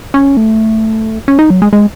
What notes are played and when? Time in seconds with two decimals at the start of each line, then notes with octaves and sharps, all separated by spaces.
0.14 C#4
0.37 A3
1.28 C#4
1.39 D#4
1.50 F#3
1.62 G#3
1.73 G#3